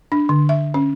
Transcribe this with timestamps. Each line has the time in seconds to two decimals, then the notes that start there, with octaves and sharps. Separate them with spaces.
0.12 D4
0.29 D3
0.49 E5
0.74 C#4